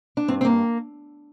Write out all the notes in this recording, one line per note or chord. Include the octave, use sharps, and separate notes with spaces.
D4
G2 C4
C4
A#3